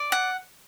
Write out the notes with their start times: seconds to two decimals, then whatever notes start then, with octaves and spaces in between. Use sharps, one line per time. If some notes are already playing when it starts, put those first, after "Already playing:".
Already playing: D5
0.12 F#5